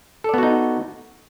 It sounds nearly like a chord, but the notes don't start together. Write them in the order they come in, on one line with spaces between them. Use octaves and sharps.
A4 D5 B3 F#4 D#4